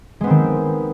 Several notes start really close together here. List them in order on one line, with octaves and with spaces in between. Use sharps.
G#3 B3 C4 D#3